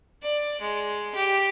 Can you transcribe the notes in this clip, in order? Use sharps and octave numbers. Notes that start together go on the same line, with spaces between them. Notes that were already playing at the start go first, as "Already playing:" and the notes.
D5
G#3
G4